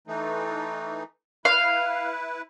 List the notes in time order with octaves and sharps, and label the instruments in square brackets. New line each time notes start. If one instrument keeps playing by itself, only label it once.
[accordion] E3 A3 D#4
[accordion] E4 B4 [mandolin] F5